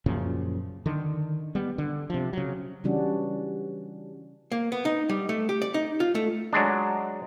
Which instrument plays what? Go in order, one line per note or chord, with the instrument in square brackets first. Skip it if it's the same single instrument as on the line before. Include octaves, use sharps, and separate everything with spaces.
[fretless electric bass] F#2 A#2 C#3 F3
D3 D#3
G3 B3
D3
C3 F3
C#3 F#3
[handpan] C#3 E3 G3 C#4 D4 F#4
[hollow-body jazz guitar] A#3
B3
D#4
G3
A3
G4
D5
D#4
F4
A3
[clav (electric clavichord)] F#3 G#3 D4